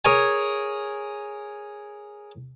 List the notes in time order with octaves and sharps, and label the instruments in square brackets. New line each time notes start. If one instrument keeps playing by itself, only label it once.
[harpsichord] G#4 A#4 C#5 G#5